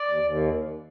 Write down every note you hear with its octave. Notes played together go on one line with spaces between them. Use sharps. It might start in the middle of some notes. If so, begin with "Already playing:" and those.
Already playing: D5
D#2
D#2